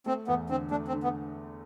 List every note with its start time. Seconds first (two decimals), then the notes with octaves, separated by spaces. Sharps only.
0.06 A3 C4
0.28 E2 B3
0.49 D3 C4
0.71 A3 D4
0.88 C4
0.93 D3
1.04 B3